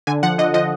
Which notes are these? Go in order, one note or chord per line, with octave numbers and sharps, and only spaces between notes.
D3 G#5
F3 F#5
D3 D#5
F3 D#5